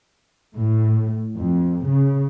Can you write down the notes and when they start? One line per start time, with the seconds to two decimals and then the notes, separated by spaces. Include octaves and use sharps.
0.57 A2
1.38 F2
1.87 C#3